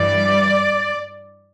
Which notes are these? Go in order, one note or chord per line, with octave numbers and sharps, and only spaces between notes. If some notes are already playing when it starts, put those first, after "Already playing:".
Already playing: G2 E3 G3 D5